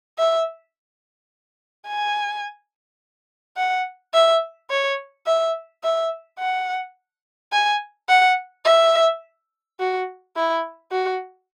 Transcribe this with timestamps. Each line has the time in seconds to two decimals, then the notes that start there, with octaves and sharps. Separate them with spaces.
0.18 E5
1.88 G#5
3.57 F#5
4.14 E5
4.70 C#5
5.27 E5
5.84 E5
6.39 F#5
7.52 G#5
8.09 F#5
8.65 E5
9.80 F#4
10.36 E4
10.92 F#4